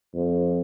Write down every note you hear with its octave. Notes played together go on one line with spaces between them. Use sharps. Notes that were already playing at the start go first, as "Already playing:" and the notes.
F2